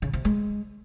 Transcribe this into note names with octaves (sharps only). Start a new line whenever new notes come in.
C#3
C3
G#3